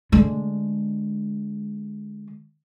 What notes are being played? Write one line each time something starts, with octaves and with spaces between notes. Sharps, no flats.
D3 G#3